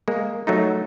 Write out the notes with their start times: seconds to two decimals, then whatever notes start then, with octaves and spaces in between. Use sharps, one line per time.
0.08 G#3 A#3
0.47 F#3 A3 D#4